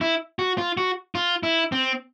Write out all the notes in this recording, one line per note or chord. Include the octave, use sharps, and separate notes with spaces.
E4
F#4
F4
F#4
F4
E4
C4